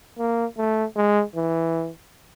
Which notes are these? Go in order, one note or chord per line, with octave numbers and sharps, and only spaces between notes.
A#3
A3
G#3
E3